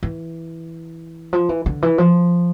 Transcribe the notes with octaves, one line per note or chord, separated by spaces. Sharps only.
E3
F3
E3
D3
E3
F3